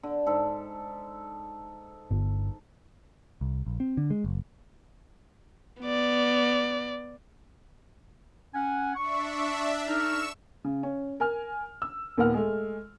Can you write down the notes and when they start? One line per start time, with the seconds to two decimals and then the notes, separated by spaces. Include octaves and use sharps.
0.03 D3
0.26 G#2 A4
2.11 G1
3.41 C2
3.66 A#1
3.80 C4
3.97 D3
4.10 G#3
4.24 F#1
5.82 B3 D5
8.55 C#4 F#5 G#5
8.96 D4 E5 C#6
9.88 D#4 A4 C#6 E6 F6 E7
10.64 C#3
10.83 C#4
11.20 A#4 G#5 F6
11.82 E6
12.18 D#2 A#2 B3 A#4 F#5 F6
12.34 G#3 A3